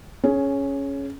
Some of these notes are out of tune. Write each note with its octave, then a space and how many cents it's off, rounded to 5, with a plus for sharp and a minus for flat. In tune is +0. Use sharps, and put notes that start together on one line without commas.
C#4 +0 G#4 +20